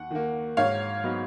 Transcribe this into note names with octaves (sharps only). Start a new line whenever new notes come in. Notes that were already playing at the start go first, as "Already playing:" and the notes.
Already playing: D#2 F#5
D#3 A#3
G#2 C#5 F5
F#3 B3 D#4